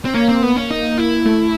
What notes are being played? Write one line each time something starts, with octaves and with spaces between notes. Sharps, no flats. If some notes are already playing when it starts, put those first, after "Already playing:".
C4
A#3 C#4
C4
B3
C#4
D#4
E4
A3